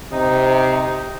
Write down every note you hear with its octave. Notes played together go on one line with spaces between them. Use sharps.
C3 D#4